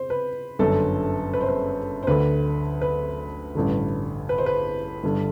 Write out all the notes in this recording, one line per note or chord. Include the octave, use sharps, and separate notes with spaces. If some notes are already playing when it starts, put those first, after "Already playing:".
Already playing: C5
B4
G1 F#2 D3 A4
B4
C5
B4
C5
D2 D3 B4
B4
A1 G2 D3
B4
C5
B4
G1 G2 D3